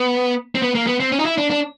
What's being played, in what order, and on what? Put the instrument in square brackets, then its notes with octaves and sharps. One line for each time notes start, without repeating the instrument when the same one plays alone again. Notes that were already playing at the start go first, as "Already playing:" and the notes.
Already playing: [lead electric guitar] B3
C4
B3
A#3
B3
C4
C#4
D#4
E4
D4
D4